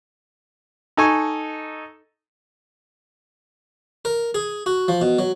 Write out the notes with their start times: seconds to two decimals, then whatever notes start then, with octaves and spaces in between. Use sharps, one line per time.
0.97 D#4 A4 G#5 C#6
4.05 A#4
4.35 G#4
4.66 F#4
4.88 F3
5.02 B2
5.19 F#3